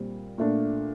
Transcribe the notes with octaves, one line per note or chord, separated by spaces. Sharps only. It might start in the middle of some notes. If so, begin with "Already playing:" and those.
Already playing: A#2 G3 C4
A#2 A3 D4